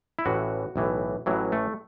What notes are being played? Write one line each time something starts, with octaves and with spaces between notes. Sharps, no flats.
E4
A1 A2 E3 F#4
B1 A2 E3
A1 A2 E3 F#3
A3